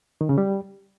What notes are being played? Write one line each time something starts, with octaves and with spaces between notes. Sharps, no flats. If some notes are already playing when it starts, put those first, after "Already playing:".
D#3
C#3
G3